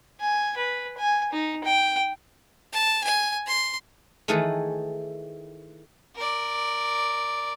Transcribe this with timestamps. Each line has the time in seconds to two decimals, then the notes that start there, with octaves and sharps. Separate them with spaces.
0.20 G#5
0.57 B4
0.98 G#5
1.33 D#4
1.64 G5
2.73 A5
3.04 G#5
3.47 C6
4.28 D#3 E3 A3 G#4 A4 B4
6.15 A#4 D5